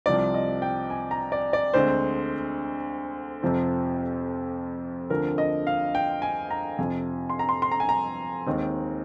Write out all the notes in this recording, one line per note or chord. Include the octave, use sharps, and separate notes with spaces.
C2 C3 F3 D5
D#5
G5
G#5
A#5
D5
D5
D2 D3 G#3 C4 C5
F2 C3 F3 C4
D2 D3 F3 C4 A#4
D#5
F5
G5
G#5
A#5
F2 C3 F3 G#5
C6
A#5
C6
C6
A#5
G#5
A#5
D#2 D#3 G#3 C4